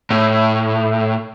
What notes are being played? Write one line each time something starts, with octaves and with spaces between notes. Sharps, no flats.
A2